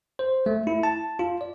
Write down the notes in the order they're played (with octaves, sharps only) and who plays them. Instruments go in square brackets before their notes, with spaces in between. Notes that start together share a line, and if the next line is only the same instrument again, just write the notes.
[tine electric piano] C5
A3
E4
A5
F4
D5